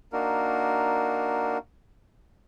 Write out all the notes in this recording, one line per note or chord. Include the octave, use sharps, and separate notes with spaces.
A#3 D4 D#4 F#4 A#4